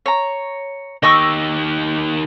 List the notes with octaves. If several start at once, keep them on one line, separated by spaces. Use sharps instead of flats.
C#5 A#5
D#3 G4 D#5 C#6 E6